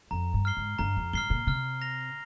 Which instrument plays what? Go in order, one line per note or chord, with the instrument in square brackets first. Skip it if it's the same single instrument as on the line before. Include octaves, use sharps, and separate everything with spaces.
[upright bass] F2 [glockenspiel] A#5
[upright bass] G2
[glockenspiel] F6 C7 G7
[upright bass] G#2
[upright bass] G2 [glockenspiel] A#5
[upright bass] F2
[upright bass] G2 [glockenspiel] F6 C7 G7
[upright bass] A#2
[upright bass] C3 [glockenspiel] F6
[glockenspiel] A#6 F7